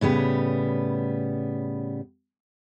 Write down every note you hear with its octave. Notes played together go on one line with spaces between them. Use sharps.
A2 C#3 G3 B3